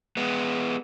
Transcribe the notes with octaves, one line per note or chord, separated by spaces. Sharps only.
G#3 B3